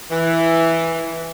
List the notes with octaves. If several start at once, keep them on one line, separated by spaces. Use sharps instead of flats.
E3